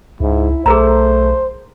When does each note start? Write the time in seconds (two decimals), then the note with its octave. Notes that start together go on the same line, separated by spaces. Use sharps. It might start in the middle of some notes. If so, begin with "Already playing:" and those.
0.20 C#2 G#2 E4
0.66 B1 A3 G#4 A#4 C5 A#5